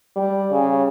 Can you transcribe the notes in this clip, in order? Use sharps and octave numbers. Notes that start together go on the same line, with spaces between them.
G3
C#3